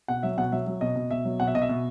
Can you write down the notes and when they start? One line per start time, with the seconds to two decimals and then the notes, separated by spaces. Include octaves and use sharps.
0.08 B2 F#5
0.23 F#3 E5
0.37 B2 F#5
0.52 F#3 E5
0.67 F#3
0.81 B2 D#5
0.96 B2
1.11 B2 E5
1.25 F#3
1.40 B2 F#5
1.47 E5
1.54 B2 D#5
1.62 E5
1.69 B2